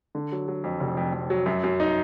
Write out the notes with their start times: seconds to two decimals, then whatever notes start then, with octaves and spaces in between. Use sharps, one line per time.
0.15 D3
0.32 F#3
0.48 F#3
0.64 F2
0.80 F1
0.97 F2
1.13 F2
1.30 F#3
1.46 F#2
1.64 F#2
1.80 D#4